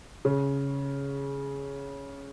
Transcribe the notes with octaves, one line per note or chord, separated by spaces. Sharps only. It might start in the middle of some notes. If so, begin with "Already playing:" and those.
C#3